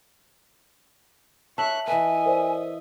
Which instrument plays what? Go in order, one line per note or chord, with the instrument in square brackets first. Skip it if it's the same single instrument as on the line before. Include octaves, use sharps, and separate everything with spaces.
[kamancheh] C#5 F#6 [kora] E5 [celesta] A5 F#7
[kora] E3 B4 [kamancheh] D#5 E5 [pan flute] G#5
[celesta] A#4 C5 D5